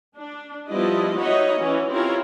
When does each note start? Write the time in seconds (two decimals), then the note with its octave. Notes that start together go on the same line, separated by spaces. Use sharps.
0.16 D4
0.68 F3 G3 B3 E4 D5 D#5
1.17 D#4 F#4 B4 C#5 D#5 E5
1.60 E3 C#4
1.91 C4 E4 F4 G4 A#4 C#5